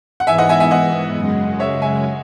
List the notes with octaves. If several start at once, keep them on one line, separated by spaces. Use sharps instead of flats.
F#5
G#2 E3 B3 E5 G#5
D#5 F#5
E5 G#5
E5 G#5
D#5 F#5
F#2 C#3 G#3
C#5 E5
E5 G#5